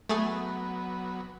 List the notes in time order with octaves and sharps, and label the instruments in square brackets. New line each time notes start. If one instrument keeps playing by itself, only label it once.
[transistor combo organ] F#3 B3 [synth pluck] A3 G#4